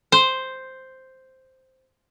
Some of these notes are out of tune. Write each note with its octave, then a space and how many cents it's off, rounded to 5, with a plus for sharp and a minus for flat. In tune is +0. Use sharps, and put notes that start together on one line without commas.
C5 +0